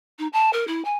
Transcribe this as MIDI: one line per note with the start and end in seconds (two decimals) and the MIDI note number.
0.18 0.27 63
0.33 0.50 81
0.53 0.64 70
0.67 0.83 64
0.84 0.97 80